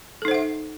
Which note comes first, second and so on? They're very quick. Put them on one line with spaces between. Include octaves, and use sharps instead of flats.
A4 D#4 C5 F#5 E5